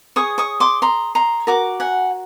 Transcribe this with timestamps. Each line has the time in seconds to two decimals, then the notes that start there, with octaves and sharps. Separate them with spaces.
0.16 G#4 C#5 C#6 D#6
0.38 C#6 D#6
0.60 C6 D6
0.82 A#5 C6
1.15 A#5 C6
1.47 F#4 A#4 D6
1.80 F#5 G#5